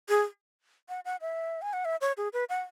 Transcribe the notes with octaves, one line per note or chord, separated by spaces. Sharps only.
G#4
F#5
F#5
E5
G#5
F#5
E5
C#5
G#4
B4
F#5